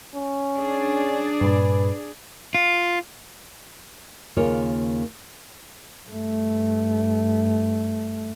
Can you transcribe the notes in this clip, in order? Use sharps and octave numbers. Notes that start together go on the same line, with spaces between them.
C#4
D4 G#4 D5
G2 A#2 B4
F4
D#2 C#3 A#3 F4 C#5
G2 A3